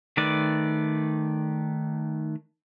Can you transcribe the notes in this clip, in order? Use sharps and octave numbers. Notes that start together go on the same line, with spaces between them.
D#3 A3 B4 D5